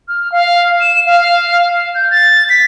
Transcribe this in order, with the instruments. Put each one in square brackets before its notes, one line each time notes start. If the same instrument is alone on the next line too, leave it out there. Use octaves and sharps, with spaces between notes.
[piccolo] F6
F5
E7
F5
G6
A6
B6